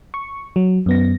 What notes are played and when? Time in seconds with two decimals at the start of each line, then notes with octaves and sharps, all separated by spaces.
0.14 C#6
0.56 F#3
0.86 F#2 B3 A#6